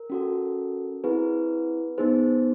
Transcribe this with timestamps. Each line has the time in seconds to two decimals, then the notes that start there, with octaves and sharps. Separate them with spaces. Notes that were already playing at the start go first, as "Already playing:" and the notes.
Already playing: A#4
0.10 C#4 F#4 A4
1.04 C4 E4 G#4 B4
1.98 B3 D#4 G#4 C5